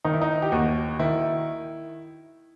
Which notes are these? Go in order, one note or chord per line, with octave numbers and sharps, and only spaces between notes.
D#3 D#4
E4
D#4
G4
D#2 F#4
D#3 E4